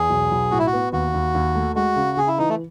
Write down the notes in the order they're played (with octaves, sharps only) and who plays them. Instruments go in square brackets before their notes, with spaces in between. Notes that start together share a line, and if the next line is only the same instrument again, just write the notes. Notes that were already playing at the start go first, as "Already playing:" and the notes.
Already playing: [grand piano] E2 [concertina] G#4
[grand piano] B1
B1
[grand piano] A2 [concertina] F#4
[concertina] E4
F#4
[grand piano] B3
[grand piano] D#2 [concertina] F#4
[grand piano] D#2
D#2
A3
[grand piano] G#3 [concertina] F#4
[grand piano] C#3
[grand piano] C#3 [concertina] G#4
[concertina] E4
[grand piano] E3 [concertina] D#4
[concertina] A3